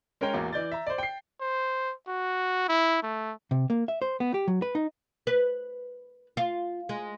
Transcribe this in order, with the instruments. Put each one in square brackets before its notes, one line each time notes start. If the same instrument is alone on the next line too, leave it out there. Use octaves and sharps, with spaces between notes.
[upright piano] G#3 C#4 A#4 C#5 G5
A1 E2 A#3 F#4 D6
E3 D5 G6 A6
E5 A#5
C5 D5
G5 C7
[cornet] C5
F#4
E4
A3
[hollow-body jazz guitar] C3
A#3
E5
C5
B3
G4
F#3
B4
D#4
[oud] B4
F4
G#3